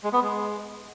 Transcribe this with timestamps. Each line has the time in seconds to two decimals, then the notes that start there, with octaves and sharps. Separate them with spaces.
0.04 G#3
0.13 B3
0.22 G#3